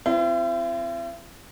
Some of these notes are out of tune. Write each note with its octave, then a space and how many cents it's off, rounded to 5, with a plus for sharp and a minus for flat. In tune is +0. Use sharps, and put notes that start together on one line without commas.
C4 -15 E4 +45